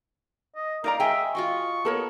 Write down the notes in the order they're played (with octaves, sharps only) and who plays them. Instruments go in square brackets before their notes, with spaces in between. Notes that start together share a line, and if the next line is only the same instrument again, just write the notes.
[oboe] D#5
[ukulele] D#4 D5 A#5 [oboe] A#4 [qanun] F5
[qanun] G#3 D#5 [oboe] E5 [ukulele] G5 G#5
[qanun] F4 F#4 D#5 [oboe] C#6
[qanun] B3 [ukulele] A4 A#4 C#5